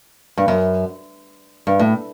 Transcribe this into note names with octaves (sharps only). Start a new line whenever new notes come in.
G2
F#2
G2
A2